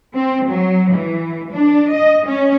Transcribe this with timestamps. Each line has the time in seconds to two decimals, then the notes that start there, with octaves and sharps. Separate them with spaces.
0.14 C4
0.48 F#3
0.91 E3
1.52 D4
1.93 D#5
2.25 C#4